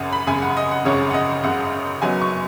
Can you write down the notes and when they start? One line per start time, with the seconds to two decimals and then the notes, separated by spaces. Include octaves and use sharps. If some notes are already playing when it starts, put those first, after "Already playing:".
Already playing: G#1 F#2 C#3 F#5 G#5
0.13 B5
0.27 G#1 F#2 C#3 G#5
0.42 F#5
0.57 D#5
0.71 F#5
0.85 G#1 F#2 C#3 C#5
1.10 F#5
1.14 D#5
1.43 G#1 F#2 C#3 F#5
2.02 F#1 F#2 F#3 B3 D#4 G#5
2.21 C#6